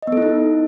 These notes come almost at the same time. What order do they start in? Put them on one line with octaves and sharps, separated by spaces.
D#5 B3 A4 E4 D#4